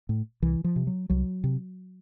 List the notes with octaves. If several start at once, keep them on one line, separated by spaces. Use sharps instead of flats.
A2
C2 E3
F3
C3
F#3
C2 F#3
C3